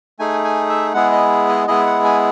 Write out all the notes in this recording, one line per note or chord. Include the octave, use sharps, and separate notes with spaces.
A3 D#4 G#4 G#5
G#5
E5
G#3 B3 E4 G#4 F#5
D#5
D#5
G#3 B3 E4 G#4 D#5
F#5
G#5